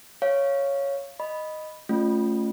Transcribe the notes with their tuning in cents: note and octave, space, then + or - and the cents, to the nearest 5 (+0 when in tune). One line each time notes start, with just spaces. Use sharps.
C#5 +0 F5 -5
D#5 -5 B5 +0
A3 +0 C#4 +0 F4 +0